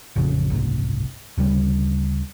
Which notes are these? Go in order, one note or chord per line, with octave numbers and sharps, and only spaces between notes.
A1 F2 C#3
F#1 C2 G#2
D2 C#3 G3